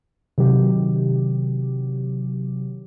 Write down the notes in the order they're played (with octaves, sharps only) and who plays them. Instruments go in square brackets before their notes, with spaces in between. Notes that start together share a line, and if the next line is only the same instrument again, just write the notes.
[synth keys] C3 D#3 F#3 G4